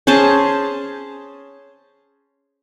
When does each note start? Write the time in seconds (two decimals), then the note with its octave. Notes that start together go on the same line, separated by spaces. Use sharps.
0.07 C#4 G#4 C5 A5